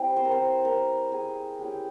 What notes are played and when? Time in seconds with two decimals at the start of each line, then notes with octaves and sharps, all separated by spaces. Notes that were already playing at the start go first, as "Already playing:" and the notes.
Already playing: G3 C4 E4
0.17 C5
0.25 A#4
0.31 C5
0.65 A#4
1.12 G#4
1.59 G#3 C#4 E4 G4